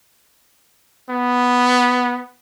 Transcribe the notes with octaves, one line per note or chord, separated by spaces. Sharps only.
B3